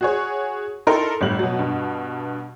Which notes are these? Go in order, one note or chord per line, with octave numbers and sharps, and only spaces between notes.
F#4 G#4 C#5
D#4 E4 A4 A#4 C6
G1 A2 G3 F#7
B2 F#3
G2 B2